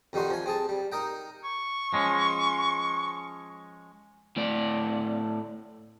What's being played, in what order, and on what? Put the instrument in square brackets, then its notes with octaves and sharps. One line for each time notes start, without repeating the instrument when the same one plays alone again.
[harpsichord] F2 D#3 G3 D#4 F#4 C6
F3 G#5
C4 G#4 A5
G3
D#4 A#4 D#5 G5
[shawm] C#6
[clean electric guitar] F3 G#3 C#4
[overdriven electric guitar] A2 D5